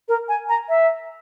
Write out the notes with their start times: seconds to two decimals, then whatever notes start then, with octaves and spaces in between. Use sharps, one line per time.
0.08 A#4
0.29 G#5
0.49 A#5
0.69 E5